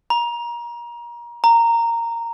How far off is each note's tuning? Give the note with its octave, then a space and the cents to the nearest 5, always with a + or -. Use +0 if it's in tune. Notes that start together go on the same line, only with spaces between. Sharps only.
A#5 +30
A#5 -10